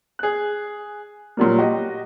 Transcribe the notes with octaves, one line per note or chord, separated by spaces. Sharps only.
G#4 F#6
A#2 F#3 G3 A#3
F#4 G4 D#5